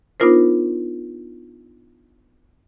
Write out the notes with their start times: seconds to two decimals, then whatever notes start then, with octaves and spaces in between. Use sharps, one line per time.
0.20 B3 D4 D#4 F4 A#4 C5